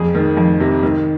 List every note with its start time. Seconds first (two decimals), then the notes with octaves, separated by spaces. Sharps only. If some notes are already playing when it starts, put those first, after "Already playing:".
Already playing: F2 G#4
0.15 D#3
0.37 F2
0.60 C3
0.83 D#3